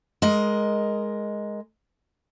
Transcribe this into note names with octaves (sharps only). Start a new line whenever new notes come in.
G#3 A#4 D#5